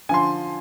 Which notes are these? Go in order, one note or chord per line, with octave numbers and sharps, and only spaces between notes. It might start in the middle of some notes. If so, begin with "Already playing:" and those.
D3 F3 G#5 C6